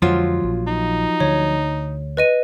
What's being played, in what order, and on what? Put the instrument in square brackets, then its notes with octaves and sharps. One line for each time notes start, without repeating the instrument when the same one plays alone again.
[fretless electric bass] F2 D3 G#3 [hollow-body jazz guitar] F3 F#3 F4
[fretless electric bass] A#1
[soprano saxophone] D#4
[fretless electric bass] D2 D3 [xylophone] C#5
[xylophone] B4 D#5 D#7